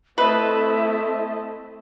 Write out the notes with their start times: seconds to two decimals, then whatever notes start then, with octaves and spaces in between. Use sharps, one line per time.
0.18 A3 C4 E4 B4 C5 D#5 E5 A5